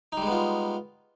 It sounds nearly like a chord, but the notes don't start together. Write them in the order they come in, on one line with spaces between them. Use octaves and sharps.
D#4 G3 G#3 B3 F4